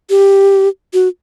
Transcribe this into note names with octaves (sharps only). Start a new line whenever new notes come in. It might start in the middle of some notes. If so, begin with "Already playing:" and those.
G4
F#4